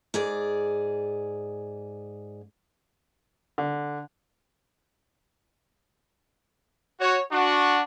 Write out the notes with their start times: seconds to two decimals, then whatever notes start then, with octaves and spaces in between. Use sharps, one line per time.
0.14 G#2 G#4 D5
3.58 D3
7.00 F#4 C#5
7.32 D4 F#4